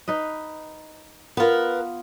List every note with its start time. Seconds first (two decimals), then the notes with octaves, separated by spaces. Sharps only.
0.08 D#4 B4 D#5
1.37 B3 F4 A#4 B4